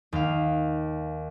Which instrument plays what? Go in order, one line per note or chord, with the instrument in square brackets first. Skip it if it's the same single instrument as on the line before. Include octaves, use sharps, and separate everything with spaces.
[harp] D#2 F5